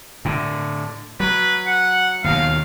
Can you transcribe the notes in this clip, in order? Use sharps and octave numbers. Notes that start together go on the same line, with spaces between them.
A2 D3
F#3 B4
F#5
D#2 B2 D#3 F5